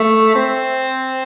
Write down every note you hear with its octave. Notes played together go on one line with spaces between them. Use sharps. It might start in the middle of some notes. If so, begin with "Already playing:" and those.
Already playing: A3
C4